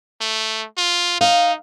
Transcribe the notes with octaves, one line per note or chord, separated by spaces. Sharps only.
A3
F4
D#4 F5